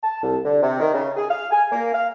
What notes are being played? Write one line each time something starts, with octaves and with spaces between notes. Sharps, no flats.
A5
C2
D3
C3
D#3
C#3
G#4
F5
G#5
A#3
F5